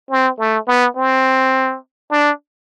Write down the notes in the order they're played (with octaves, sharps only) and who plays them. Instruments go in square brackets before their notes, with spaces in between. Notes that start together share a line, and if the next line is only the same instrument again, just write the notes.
[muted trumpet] C4
A3
B3
C4
D4